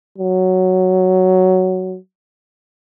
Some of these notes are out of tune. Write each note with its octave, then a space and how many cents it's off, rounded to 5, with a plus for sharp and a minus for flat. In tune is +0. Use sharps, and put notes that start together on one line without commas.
F#3 +5